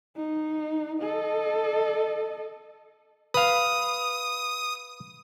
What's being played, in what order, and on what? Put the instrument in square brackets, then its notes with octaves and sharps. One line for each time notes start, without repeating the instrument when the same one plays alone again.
[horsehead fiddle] D#4
A4 D#5
[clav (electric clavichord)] B4 F5 [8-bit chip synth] D#6